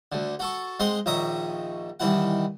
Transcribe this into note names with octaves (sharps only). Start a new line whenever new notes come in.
D2 D3
F#4 A4 C#6
G#3 C4 D#5 F#5 C6
A#1 D#3 C#5 E5 A#5 D#6
C2 D#3 E3 E4 F#5